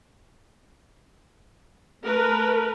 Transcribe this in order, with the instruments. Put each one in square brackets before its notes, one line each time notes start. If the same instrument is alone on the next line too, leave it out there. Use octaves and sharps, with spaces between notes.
[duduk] A3 [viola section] A#4 B4